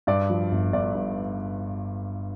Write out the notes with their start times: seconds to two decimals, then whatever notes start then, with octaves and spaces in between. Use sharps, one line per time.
0.07 G2 D5
0.30 F3
0.51 G1
0.73 G1 D5
0.95 G2